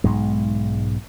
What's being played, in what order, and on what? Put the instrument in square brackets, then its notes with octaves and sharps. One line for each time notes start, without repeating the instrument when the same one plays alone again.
[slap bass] B1 G#2 G#3